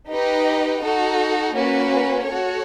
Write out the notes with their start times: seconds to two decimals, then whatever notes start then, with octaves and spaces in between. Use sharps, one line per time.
0.10 D#4 G4 B4 D#5
0.82 D#4 F#4 A4
1.54 A#3 C#4 F#4 B4
2.26 F#4 A4 C#5